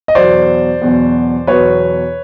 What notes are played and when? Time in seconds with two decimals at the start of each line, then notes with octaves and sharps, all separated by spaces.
0.08 D#5
0.15 E2 B2 F#3 C5 D5
0.81 E2 B2 F#3
1.47 E2 B2 F#3 B4 C#5